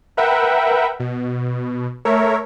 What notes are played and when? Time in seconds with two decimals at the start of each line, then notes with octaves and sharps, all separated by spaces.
0.17 A#4 B4 E5 F#5 G5
1.00 B2
2.05 A3 A#4 C#5 E5